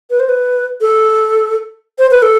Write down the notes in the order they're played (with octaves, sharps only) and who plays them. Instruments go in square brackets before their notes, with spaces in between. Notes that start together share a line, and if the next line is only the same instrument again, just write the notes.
[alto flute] B4
C5
B4
A4
C5
B4
A4